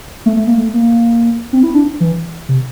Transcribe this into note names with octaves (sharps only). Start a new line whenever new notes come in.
A3
A3
A#3
A3
A#3
C4
E4
D4
E3
C3